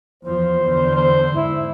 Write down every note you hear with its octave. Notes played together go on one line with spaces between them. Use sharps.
E2 F3 C5
E2 D3
C5
G#2 E4